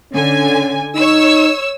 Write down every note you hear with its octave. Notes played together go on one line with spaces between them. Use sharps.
D3 C#4 G#5
D#4 C#5 E6